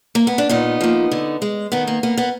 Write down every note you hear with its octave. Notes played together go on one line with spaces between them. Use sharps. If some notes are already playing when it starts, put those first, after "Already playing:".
A#3
B3
D4
A#2 B3 D#4
F3 A#3
D3
G#3
D#3 B3
A#3
A#3 B3
B3